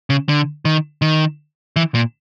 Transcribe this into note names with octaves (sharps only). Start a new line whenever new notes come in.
C#3
D3
D#3
D#3
E3
A#2